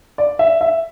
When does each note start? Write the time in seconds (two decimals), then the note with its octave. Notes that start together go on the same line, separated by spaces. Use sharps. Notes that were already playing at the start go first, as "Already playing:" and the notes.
0.18 D5
0.39 E5
0.61 E5